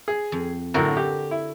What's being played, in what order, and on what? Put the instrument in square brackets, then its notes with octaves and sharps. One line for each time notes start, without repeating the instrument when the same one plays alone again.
[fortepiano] G#4
[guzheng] F2
[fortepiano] F#2 A2 [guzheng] D3 F#4 A#4
[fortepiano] G4
E4